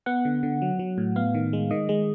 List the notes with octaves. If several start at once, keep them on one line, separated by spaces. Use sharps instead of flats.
B3 F#5
D3
D3
F#3
F#3
A2
B3 F5
D#3
G#3
D#3 D#5
G#3